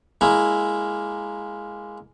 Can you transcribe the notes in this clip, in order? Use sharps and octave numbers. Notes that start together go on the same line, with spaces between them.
G#3 A#3 E4